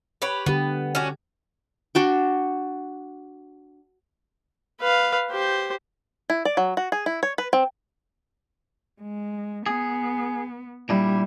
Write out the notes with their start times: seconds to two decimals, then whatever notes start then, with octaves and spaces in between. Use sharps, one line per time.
0.22 G4 B4 C#5
0.46 D3 B3 G4
0.95 C#4 D4 F#4
1.95 D4 F#4 G5
4.80 B4 F5
5.31 G4 C5
6.30 E4
6.45 D5
6.57 F#3
6.77 F#4
6.92 G#4
7.06 E4
7.23 C#5
7.38 B4
7.53 C4
9.01 G#3
9.66 B3 G#4
10.89 A#2 G3 D4 E4